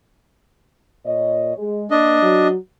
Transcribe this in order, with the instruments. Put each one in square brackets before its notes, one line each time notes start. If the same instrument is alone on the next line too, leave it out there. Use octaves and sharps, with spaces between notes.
[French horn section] A#2 C#5 D#5
G#3 G#4
[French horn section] A#3 [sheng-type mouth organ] D4 D#5
[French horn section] F#3 F#4